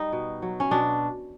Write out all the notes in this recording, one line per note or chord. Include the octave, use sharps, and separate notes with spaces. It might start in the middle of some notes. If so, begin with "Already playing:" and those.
Already playing: G3 D#4
B2
F#3
C#4
B2 D4